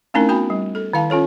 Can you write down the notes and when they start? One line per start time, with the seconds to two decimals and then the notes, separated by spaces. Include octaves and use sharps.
0.14 A3 C4 C#4 D#4 E4 A#4
0.29 B3 F#4 G#5 B5
0.50 G3
0.75 A4
0.93 D#3 E4 F5 A5
1.10 C#4 F4 A4 C#5